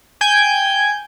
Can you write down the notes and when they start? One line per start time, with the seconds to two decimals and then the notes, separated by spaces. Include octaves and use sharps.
0.21 G5 G#5 G6 G#6